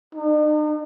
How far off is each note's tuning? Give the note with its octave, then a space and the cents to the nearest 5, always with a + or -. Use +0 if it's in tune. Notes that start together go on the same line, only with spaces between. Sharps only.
D#4 -45